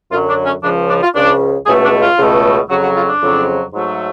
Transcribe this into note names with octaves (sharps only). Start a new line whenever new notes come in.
F#2 D3 F#3 F4
D4
C#4
C#2 C#3 F3 D4
D4
F4
C#2 C#3 F3 D4
C#2 B2 A3 G#4
D4
F4
C#2 B2 A3
F2 C#3 F#3 F#4
F#4
F4
D4
F2 C#3 F#3
G#2 F#3 A3